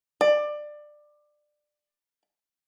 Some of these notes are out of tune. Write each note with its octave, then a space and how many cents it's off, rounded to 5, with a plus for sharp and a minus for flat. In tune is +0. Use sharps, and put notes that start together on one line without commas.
D5 +20